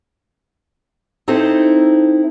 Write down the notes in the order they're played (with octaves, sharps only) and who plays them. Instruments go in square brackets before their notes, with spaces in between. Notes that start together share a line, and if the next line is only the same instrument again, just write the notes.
[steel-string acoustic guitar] C4 D#4 E4 A4 C5